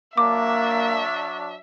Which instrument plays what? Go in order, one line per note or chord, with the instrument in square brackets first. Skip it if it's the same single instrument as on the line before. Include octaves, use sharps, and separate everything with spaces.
[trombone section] F#3 D4 [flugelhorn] A#3 [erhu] E5 [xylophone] D6